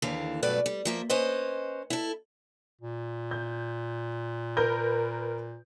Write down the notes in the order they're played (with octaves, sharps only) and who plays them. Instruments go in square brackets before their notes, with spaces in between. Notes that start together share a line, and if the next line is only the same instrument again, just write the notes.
[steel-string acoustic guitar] D#2 D3 E3 F5
G2 B2 F#3 A3 B4 D5
G3
F3 A#3 E5
C#4 B4 C5 D#5
E4 A4
[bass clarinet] A#2
[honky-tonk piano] G6
A#4 B4 G6